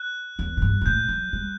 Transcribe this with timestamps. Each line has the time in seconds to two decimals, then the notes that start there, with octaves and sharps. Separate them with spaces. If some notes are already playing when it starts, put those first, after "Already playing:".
Already playing: F#6
0.39 E2
0.57 A2
0.62 G2
0.81 G2
0.86 A2 G6
1.09 F#3
1.33 G3